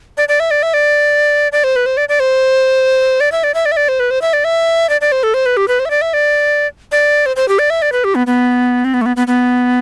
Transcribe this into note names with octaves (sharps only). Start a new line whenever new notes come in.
D5
D5
E5
D5
E5
D5
D5
C5
B4
C5
D5
D5
C5
D5
E5
D5
E5
D5
E5
D5
C5
B4
C5
E5
D5
E5
D5
D5
C5
A4
C5
B4
G4
B4
C5
E5
D5
E5
D5
D5
C5
C5
G4
D5
E5
D5
B4
G4
B3
B3
C4
B3
A3
B3
B3
B3